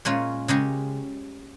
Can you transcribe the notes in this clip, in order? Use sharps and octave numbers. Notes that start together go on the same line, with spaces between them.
A#2 G#3 C#4 F4
C#3 G#3 C#4 G4